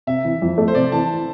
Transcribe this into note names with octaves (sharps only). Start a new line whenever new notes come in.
C3 E5
E3
F2
A3
C5
C3 D5
E3 A5